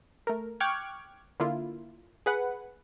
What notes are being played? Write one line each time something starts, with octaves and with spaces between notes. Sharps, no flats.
A3 A#4
G5 C#6 D6 F6 F#6 G#6
D3 A#3 E4 F4
G#4 B4 F#5